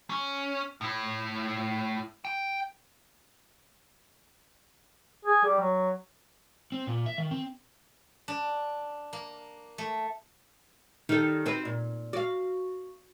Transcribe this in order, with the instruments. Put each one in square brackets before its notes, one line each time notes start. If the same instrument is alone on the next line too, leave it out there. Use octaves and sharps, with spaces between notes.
[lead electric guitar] C#4
A2 E4
G5
[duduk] G#4
G3
F#3
[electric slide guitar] C4
A#2
E5
D#3
C4
[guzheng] D4
A#3
A3
[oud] D#3 G3 A4 [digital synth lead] D#4
[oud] C4 F#4 B4
A#2
[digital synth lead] F#4 [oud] D5 F5